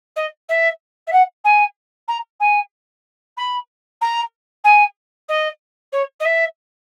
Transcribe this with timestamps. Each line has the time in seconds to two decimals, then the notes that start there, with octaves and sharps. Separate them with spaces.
0.16 D#5
0.48 E5
1.07 E5
1.12 F#5
1.44 G#5
2.08 A#5
2.40 G#5
3.37 B5
4.01 A#5
4.64 G#5
5.28 D#5
5.92 C#5
6.20 D#5
6.25 E5